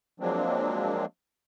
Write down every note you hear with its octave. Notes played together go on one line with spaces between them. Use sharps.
F3 F#3 G#3 A#3 C4 D4